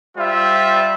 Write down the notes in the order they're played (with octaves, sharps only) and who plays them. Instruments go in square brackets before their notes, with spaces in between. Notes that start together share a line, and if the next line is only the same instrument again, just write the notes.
[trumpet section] G3 F4 C5 E5